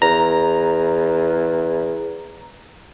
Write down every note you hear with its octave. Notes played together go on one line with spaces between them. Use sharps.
E2 A#5